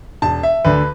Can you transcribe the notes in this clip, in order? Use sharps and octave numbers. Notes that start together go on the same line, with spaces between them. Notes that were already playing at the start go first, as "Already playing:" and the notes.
E1 A5
E5
D2 D3 B4